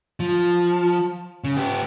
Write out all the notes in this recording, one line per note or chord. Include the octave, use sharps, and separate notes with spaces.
F3
C#3
B3 G4